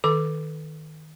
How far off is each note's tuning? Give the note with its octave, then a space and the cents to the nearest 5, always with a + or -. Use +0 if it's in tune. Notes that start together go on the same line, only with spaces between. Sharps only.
D#3 +0 A4 +0 D6 +5